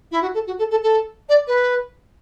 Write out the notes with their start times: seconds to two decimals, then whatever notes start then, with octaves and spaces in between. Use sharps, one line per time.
0.12 E4
0.22 F#4
0.34 A4
0.47 F#4
0.59 A4
0.71 A4
0.83 A4
1.29 D5
1.47 B4